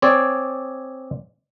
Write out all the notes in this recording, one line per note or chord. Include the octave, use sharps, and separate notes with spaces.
C4 G#4 C#5 D5